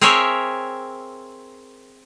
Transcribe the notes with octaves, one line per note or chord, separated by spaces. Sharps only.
C4 G#4 A#4 C#5 E5 G5